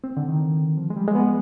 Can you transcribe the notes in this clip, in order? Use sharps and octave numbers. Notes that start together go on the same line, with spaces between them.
C4
D3
D#3
F3
G#3
G3
G#3
B3